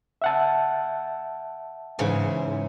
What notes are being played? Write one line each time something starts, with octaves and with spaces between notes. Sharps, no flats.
E5 F#5 A5
G#2 C#3 E3